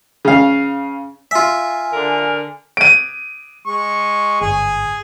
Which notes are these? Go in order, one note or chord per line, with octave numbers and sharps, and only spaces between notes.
C#3 F5
F4 E5 G#5
D3 A#4
D7 D#7
G#3 C#6
G1 G#2 G#4 G#5